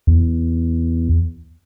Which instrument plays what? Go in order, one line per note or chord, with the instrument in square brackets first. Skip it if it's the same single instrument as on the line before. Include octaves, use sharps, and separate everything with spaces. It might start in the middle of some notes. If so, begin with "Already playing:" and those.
[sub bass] E2